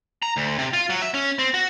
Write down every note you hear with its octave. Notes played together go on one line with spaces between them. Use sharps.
A#5
D2
C3
F4
F#3
E5
C#4
C4
F#4